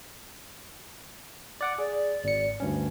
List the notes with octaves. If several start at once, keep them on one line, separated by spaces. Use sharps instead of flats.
D5 F#5 D6
G#4 D5
G#1 C#7
D2 G2 C#4